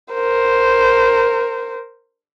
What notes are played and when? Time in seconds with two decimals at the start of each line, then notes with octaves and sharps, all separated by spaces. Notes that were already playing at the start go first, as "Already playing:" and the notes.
0.14 A#4 C5